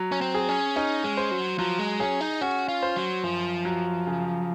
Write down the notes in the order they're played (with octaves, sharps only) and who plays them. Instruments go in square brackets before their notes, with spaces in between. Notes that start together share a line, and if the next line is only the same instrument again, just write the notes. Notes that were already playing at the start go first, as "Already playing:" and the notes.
Already playing: [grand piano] F#3
[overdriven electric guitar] C#4
C4
[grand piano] G#4
[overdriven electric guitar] C#4
[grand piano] C#4 [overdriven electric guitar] D#4
[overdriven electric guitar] G#3
[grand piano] C5
[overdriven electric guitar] F#3
[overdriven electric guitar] F3 [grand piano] F#3
[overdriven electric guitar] G#3
[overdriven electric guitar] C#4 [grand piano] G#4
[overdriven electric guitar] D#4
[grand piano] C#4 [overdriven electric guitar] F#4
[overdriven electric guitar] F4
[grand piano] C5
[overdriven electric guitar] F#3
[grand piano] F#2 [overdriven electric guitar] F3
[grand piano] F#3
C#3